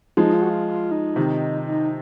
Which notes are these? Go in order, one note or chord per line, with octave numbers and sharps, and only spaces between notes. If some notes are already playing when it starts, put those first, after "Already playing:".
F3 G#3 D#4
F4
F#4
F4
F4
D#4
C3 D#3
D#4